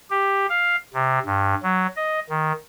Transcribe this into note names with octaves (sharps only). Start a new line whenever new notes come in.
G4
F5
C3
G2
F#3
D#5
D#3